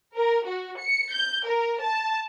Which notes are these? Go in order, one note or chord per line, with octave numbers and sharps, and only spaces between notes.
A#4
F#4
C#7
G6
A#4
A5